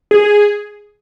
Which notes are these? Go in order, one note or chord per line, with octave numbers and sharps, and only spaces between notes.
G#4